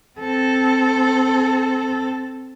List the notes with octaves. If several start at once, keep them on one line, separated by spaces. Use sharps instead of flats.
C4 A4